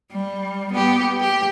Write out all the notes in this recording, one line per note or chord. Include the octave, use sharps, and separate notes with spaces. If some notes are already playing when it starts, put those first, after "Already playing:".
G3
B3 G4
G4